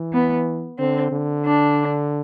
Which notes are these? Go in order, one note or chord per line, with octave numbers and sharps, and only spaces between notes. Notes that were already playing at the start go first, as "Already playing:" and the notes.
Already playing: E3
B3
D3 C4
D3
D4